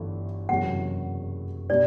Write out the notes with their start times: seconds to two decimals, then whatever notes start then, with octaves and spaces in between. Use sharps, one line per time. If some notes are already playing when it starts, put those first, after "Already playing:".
Already playing: G1 G2 E3 A3
0.49 F#1 E2 C3 F#3 F#5
1.69 B2 G3 D4 D5